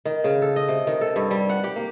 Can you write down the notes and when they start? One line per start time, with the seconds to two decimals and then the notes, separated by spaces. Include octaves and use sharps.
0.05 D#3
0.24 C#3
0.42 A4
0.56 D#5
0.68 C3
0.87 D#3
1.01 A4
1.16 G2
1.31 G3
1.49 F#5
1.64 G4
1.76 A#3